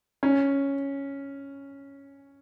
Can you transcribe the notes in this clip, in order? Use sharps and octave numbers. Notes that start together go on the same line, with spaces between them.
C#4